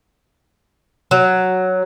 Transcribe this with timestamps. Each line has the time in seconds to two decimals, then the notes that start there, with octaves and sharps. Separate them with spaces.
1.11 F#3